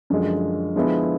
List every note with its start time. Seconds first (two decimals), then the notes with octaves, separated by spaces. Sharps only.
0.10 F#2 D3 F3 G#3
0.75 D3 F3 G#3 B3 E4